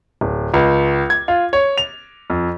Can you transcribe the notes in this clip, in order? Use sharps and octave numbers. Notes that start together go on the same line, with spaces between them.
D1
C#2
G#6
F4
C#5
F7
F2